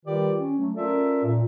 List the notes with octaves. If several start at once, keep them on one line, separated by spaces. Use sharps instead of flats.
D#3 G3 F4 G4 B4 D5
C#4
F#3 A3
C#4 F4 A4 A#4 D5 E5
A#2